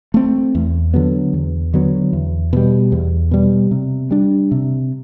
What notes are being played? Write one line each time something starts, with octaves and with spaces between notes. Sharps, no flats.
A3 C4
E2
D3 F#3 B3
E2
D3 F#3 B3
E2
B2 G3
E2
B2 G3
C3
G3 D4
C3